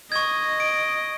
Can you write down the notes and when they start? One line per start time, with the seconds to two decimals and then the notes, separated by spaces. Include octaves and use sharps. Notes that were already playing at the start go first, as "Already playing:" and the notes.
0.12 D#5 C#6 G#6
0.60 D7